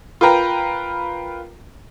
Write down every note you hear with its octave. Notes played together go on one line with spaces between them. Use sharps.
F4 A#4 B4 G5 A#5